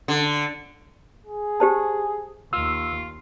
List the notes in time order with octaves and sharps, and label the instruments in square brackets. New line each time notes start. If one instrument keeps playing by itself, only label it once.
[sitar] D3
[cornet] G#4
[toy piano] G4 C5 A5
[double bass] D#2 [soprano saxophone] F4 [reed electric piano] E6